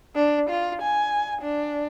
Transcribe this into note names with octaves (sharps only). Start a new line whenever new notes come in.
D4
F4
G#5
D4